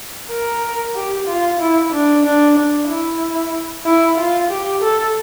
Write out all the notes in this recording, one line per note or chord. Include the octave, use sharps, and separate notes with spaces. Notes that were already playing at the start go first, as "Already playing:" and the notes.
A#4
G4
F4
E4
D4
D4
D4
E4
E4
F4
G4
A4